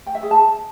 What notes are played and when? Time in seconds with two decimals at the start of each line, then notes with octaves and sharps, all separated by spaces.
0.06 G5
0.15 E5
0.23 G#4
0.31 A5